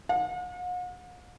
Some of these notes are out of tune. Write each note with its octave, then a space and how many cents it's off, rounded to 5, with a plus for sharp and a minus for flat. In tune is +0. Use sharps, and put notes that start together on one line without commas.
F#5 -45